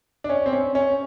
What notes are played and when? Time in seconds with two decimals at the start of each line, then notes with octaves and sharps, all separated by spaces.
0.24 D4
0.29 C#4
0.46 C4
0.53 C#4
0.75 C#4